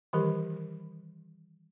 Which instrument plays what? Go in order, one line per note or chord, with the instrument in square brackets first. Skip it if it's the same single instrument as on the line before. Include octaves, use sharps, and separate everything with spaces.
[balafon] D#3 E3 G3 G4 A#4